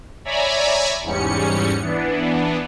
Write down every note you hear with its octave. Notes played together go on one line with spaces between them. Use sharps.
C#5 D5 E5 G#5 A#5 B5
E2 G#2 G3 C#4 C#7
E3 B3 D4